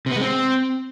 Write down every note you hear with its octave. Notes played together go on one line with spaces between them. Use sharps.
C3
B3
G#3
C4